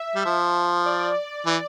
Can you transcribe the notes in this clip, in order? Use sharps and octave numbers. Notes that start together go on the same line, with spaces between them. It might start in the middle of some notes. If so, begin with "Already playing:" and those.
Already playing: E5
G3
F3
D5
E3